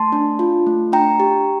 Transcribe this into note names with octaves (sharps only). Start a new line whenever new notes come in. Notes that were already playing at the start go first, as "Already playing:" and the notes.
Already playing: A3 A5 C6
D4
F4
A3
D4 G5 A#5
G4